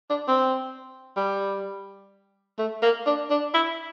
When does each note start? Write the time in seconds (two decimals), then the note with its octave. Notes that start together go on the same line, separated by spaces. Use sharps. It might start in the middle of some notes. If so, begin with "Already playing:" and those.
0.10 D4
0.28 C4
1.17 G3
2.59 A3
2.83 A#3
3.06 D4
3.30 D4
3.54 E4